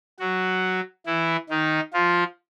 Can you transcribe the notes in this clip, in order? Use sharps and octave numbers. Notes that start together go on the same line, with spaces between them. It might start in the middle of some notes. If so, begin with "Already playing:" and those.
F#3 F#4
E3 E4
D#3 D#4
F3 F4